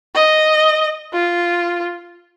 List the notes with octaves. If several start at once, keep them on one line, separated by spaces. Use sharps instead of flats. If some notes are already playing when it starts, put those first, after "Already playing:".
D#5
F4